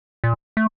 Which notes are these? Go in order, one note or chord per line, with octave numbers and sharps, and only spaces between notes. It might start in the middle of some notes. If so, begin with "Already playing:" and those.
A#2
A3